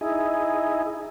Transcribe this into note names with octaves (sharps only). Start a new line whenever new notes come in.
D#4 E4 G#4